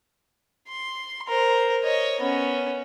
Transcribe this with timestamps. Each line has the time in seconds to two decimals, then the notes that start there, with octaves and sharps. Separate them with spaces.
0.68 C6
1.27 A#4 C5
1.84 C#5 D#5
2.20 B3 C#4